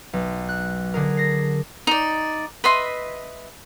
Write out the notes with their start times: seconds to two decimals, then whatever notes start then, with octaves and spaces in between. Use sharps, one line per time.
0.13 B1
0.49 F#6
0.94 D3 G#4 A#4
1.17 A#6 C7
1.87 D#4 D5
2.64 B4 D#5 E5 C6